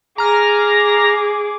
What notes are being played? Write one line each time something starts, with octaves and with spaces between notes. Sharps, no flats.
G#4 A#5 D6 F6 A#6